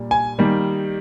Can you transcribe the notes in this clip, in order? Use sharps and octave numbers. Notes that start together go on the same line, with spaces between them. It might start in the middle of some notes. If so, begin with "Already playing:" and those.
Already playing: A#2 G3 D4
G#5
D#3 G3 A#3